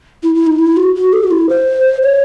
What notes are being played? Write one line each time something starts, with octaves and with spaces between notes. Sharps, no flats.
E4
E4
D#4
E4
F#4
F#4
A4
F#4
E4
C5
C#5